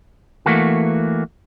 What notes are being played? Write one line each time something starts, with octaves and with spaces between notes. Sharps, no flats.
E3 A3 A#3 F#4